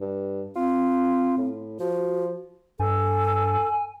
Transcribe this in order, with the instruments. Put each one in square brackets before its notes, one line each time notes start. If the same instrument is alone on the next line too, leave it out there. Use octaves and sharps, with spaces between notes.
[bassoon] G2
[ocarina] C4 [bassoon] F4
[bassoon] A2
[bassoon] F3 [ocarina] F#4
[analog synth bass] G2 [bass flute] A4 [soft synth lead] G#5